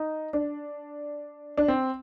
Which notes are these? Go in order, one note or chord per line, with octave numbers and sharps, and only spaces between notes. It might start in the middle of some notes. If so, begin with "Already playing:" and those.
Already playing: D#4
D4
D4
C4